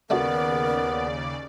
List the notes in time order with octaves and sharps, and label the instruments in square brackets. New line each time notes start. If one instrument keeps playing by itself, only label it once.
[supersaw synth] D#2 C#3 D5 [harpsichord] A3 D4 F#4 [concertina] B3 [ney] A#4